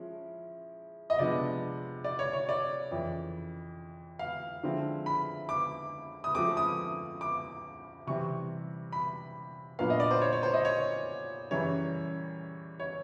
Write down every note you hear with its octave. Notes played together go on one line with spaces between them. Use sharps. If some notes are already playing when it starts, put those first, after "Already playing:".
Already playing: F3 G#3 C#4 E4
D#5
C3 F3 G#3 B3 D4 D5
D5
C#5
C#5
D5
F2 C#3 E3
F5
D3 F3 G#3 C4 E4
B5
D6
D#6
C#3 F3 A3 C4 D6
D#6
D6
C3 E3 G3 C4 C#6
B5
A#2 F#3 B3 D4 F5
D#5
D5
C5
C#5
C#5
C5
D#5
C#5
F#2 C#3 E3 G3 C#5
C#5